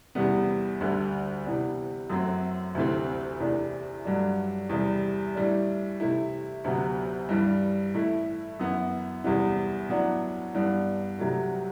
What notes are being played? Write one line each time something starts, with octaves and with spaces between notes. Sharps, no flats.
E2 C3 G3 B3
D2 D3 G3
C3 E3 B3 D4
F#2 F#3 A3 C4
D2 C3 E3 A3 C4
E2 C3 E3 A3 D4
G2 F#3 A3 D4
E2 C3 G3
A2 G3 D4
C3 E3 A3 E4
D2 C3 F#3 B3
G2 E3 G3
A2 E3 A3 E4
F#2 E3 B3 E4
E2 C3 G3 B3 E4
A2 F#3 B3 D4
G2 E3 B3 D4
C2 C3 F#3 A3